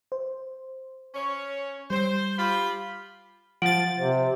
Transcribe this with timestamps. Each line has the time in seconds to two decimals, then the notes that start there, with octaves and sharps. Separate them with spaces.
0.12 C5
1.14 C#4 C#5
1.90 G3 C5
2.37 F4 G4 B5
3.62 F3 F#5 A6 D7 F#7
3.99 C3 C5